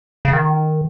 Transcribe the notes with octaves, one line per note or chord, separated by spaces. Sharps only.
C#3
D#3